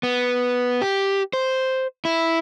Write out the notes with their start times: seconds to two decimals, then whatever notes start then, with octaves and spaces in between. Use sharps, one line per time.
0.03 B3
0.82 G4
1.33 C5
2.05 E4